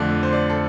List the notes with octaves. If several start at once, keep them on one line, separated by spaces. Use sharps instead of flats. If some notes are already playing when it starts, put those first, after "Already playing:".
Already playing: F2 D3 A3 D5
C5
D5
A4